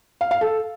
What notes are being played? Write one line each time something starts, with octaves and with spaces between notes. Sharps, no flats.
F5
F5
A4